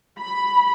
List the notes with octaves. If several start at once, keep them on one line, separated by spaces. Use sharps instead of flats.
B5